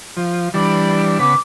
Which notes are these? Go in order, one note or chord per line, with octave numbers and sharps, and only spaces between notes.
F3
E3 G3 D4 B5
C#3 B3 B5 D6